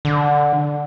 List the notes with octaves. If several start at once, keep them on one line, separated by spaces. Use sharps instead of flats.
D3